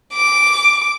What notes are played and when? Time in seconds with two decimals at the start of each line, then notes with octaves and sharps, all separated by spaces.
0.13 D6